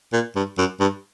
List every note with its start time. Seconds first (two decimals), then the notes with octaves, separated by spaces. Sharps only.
0.13 A#2
0.36 G2
0.58 F#2
0.80 G2